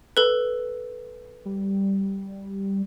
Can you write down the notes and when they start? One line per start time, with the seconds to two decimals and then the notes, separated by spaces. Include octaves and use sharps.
0.17 A4 B4
1.45 G3